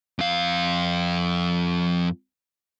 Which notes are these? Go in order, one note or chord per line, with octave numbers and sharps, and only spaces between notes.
F2 F5